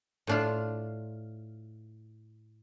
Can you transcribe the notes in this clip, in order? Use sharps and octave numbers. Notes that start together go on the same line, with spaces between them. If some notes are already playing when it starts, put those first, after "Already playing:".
A2 D4 F4